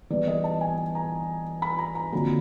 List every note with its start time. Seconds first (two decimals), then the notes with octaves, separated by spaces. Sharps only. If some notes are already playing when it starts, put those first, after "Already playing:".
0.10 E3 G3 B3 D5
0.27 D#5
0.44 A5
0.61 G#5
0.95 A#5
1.62 B5
1.79 A#5
1.95 A#5
2.12 F2 D3 F#3 A#3